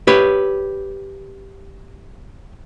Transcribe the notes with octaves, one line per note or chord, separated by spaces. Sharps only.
G4 B4 C#5